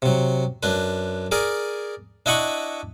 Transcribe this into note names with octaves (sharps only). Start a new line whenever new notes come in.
C3 F#3
F#2 D4 B4
G#4 A#4 D5
D4 E4 D#5 F#5 B5 C#6